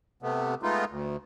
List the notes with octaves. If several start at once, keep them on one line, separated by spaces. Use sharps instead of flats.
C3 A3 B3
G#3 A3 B3 D#4 F4
D2